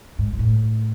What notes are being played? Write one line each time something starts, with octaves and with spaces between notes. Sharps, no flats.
G#2
G#2
A2